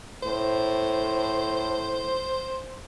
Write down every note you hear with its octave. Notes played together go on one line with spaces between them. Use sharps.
A2 C5